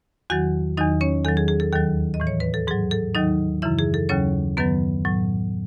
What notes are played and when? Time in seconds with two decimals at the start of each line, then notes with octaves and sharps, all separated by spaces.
0.30 E2 D#3 F#3 F#4 F#5
0.77 E2 D#3 F#3 D#4 D#5
1.01 C#4 C#5
1.24 E2 D#3 F#3 A4
1.37 G#4
1.48 G#4
1.60 A4
1.73 D#2 D#3 F#3 A4
2.14 D#5
2.20 A2 E3
2.27 C#5
2.40 B4
2.54 A4
2.67 G#2 F#3 G#4
2.91 A4
3.15 D#2 D#3 F#3 D#4 D#5
3.62 F#2 C#3 E3 E4 E5
3.79 G#4
3.94 A4
4.09 D#2 C#3 F#3 C#4 C#5
4.57 F#2 D#3 F#3 B3 B4
5.05 A2 F#3